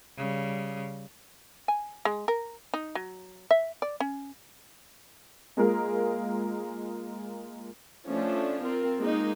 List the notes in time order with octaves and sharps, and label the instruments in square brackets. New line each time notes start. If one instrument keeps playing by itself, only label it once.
[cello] C#3 G3
[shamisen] G#5
G#3
A#4
D#4
F#3
E5
D5
C#4
[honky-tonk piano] G#3 A#3 F4 G#4 A#4
[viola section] F3 A3 C#4 D4
C4 F4 A#4
G#3 A#3 D#4